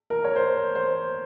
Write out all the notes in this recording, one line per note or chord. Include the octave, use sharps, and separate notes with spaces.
A#4
C#5
C5
C5